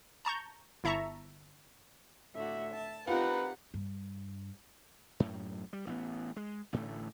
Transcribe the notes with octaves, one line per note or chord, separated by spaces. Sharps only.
A5 A#5 C#6 G6
G1 E4 E5 A5 A#5 C#6
A2 D3 F#4 E5
A5
C4 D#4 F4 G4 A#4 B4 F#5
G2
F#2 A2
G3
A1 B3
G#3
A1 A2 D3 A3